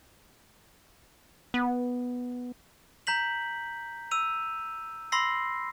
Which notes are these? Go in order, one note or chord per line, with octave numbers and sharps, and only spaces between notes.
B3
A#5 G6 B6 F#7
E6 D#7 F7
B5 C6 E6 A#6 C7